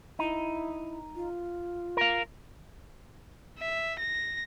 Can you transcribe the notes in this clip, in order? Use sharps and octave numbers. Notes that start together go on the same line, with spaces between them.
D#4 E4
F4
A#4 F5
E5
A#6